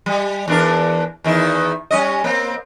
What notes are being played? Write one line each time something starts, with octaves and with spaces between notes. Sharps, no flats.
G3
E2 D4 A#4
E2 D#3 E4
G3 C#4 D#5
A#3 C4